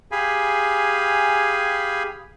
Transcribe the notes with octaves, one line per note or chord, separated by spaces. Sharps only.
G4 G#4 F5 G#5 B5